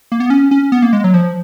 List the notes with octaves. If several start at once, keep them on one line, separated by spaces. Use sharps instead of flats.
A#3
B3
C#4
C#4
B3
A#3
G#3
F#3
F3